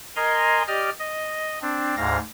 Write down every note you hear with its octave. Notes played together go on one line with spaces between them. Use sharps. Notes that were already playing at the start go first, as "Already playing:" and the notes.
A#4 D#5 G#5 A#5 C6
G4 D5 D#5 F6
D#5
C4 D4
D2 G#2 F5 A#6